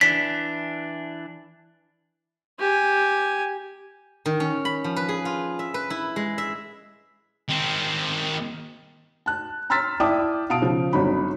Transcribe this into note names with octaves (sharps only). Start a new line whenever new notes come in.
E3 D4 B6
G4 G#5
D#3
C#4
B5
F3
B4
G#4
F4
E5
B4
E4
G#3
E5
D#3 C4
A5 F#6
A#5 C6 E6 F6 A6 B6
E4 D5 G5 A5 D6 D#6
B2 F5 A5 D#6 D7
C#3 F3
G1 G#2 F#3 C#4 D#4 B5